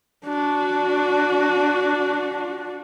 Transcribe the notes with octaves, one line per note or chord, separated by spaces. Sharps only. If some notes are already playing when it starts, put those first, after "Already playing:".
D4 F#4